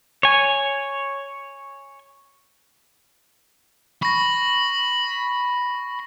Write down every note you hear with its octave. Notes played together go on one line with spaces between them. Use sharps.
C#5 G#5
B5 C#6 A#6